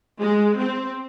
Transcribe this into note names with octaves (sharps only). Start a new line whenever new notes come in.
G#3
C4